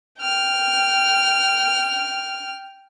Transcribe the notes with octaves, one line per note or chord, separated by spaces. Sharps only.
G5 F6